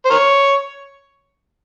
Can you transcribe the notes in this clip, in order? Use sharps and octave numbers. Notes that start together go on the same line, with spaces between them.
C5
A#4 C#5